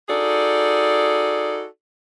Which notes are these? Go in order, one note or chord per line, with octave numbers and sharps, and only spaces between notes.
D#4 F#4 G#4 A4 D5